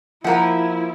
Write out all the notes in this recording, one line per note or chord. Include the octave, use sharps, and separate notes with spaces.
F3 A#3 E4 F#5 A#5